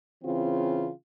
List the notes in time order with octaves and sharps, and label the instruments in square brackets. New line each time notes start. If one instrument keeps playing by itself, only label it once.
[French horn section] C#3 E3 C4 F4